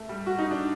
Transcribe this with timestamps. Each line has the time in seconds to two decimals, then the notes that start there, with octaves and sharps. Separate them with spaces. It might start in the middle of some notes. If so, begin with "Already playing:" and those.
Already playing: A3
0.09 G3
0.26 F#4
0.38 D#4
0.51 D4